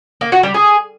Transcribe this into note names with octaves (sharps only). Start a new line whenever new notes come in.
A#3
F#4
G3
G#4